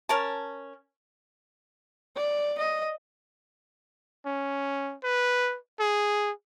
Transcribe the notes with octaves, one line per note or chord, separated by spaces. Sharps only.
C#4 A#4 A5
D5
D#5
C#4
B4
G#4